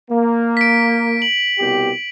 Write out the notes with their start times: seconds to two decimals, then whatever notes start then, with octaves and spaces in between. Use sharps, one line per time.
0.11 A#3
0.57 B6 D7
1.22 F#7
1.59 C2 B2 G4